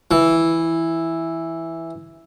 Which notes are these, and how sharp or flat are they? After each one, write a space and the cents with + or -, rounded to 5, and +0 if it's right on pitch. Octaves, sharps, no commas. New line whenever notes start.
E3 +0